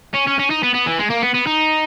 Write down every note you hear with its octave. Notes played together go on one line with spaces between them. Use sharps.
C#4
C#4
C#4
D#4
B3
B3
E3
G#3
A#3
B3
B3
D#4